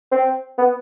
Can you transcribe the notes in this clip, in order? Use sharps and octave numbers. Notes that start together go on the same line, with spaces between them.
C4
B3